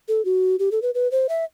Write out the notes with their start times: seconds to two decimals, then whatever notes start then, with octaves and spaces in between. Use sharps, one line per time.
0.08 A4
0.25 F#4
0.59 G4
0.71 A4
0.82 B4
0.95 B4
1.11 C5
1.29 E5